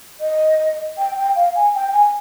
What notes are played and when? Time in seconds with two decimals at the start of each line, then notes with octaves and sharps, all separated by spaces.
0.21 D#5
0.98 G5
1.17 G5
1.36 F5
1.56 G#5
1.75 G5
1.93 G#5